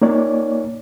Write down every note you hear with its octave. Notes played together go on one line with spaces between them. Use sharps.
A#3 D#4 C#5 D5